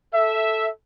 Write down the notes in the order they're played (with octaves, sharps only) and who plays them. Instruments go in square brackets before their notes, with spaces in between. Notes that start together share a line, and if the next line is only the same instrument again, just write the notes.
[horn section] A4 E5